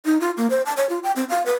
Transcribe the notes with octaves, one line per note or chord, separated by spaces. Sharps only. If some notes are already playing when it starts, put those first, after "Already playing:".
D#4
F4
A#3
C5
A5
C#5
F4
G5
C4
F5
B4